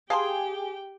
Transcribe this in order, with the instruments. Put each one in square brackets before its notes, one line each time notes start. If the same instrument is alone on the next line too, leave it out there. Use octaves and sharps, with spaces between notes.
[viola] G4 G5 [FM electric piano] G#4 [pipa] F5 A5 C6